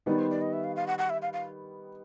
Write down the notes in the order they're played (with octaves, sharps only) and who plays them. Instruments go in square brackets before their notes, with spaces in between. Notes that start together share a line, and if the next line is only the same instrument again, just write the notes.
[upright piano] D#3 G3 B3 D#4 [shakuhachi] D5
[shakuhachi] C5
D5
D#5
E5
F5
F5
F#5
F#5
E5
F5
F5